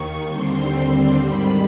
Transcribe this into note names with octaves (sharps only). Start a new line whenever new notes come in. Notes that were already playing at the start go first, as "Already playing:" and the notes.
Already playing: D#2 D#3 C#6
D#2 D3 G3 C4 C6
G#2 D#3 G3 B5